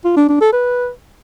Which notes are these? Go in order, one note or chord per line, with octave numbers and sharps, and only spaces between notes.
F4
D4
D4
A4
B4